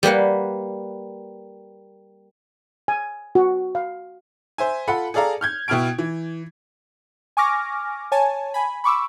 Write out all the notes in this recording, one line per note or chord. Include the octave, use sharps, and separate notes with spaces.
G3 A#3 B4 F#5
G#5
F#4
F5
C5 E5 G#5
F4 A4 F#5 B5 C#7
G#4 A4 D5 F5 A#5
F6 G6 G#6
B2 E4 G5 F6 G#6 D7
E3
G#5 C#6 D6 F6 A#6
C#5 G#5 A5
G#5 B5
B5 C#6 D6 E6